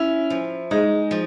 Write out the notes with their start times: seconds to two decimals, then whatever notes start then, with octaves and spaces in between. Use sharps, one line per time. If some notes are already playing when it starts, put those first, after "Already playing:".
Already playing: C#4 E4
0.30 F3
0.71 G#3 D#4
1.11 F3